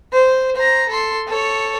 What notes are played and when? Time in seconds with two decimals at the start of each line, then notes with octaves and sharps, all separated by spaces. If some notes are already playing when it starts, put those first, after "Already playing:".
0.13 C5
0.56 C5 A#5
0.89 A4 C6
1.28 A4 C#5